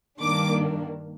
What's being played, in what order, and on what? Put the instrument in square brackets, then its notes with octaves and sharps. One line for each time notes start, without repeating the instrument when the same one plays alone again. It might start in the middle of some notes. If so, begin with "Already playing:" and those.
[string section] G2 D#3 A#3 D4 D6